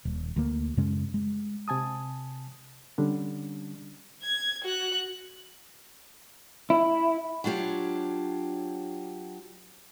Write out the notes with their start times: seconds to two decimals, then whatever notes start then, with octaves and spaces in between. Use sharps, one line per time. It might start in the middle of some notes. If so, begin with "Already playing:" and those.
0.05 D#1
0.36 D2 A3 A#3
0.77 F#2 C#3 G#3 C#4
1.14 G#3
1.68 C3 G#5 A5 D#6
2.98 D3 G3 C#4 D4
4.23 G#6
4.64 F#4 F#6
6.70 E4
7.44 F#3 D4 F4 G4 C#5